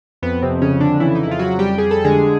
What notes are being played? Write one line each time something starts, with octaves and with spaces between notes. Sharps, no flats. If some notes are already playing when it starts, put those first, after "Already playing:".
F2 B3
C3 C4
F2
C#3 C#4
F2
D3 D4
C#3 E3 E4
D#4
E4
F2 F4
F#3 F#4
F2
G3 G4
G3 G#4
A4
D3 G#3 G#4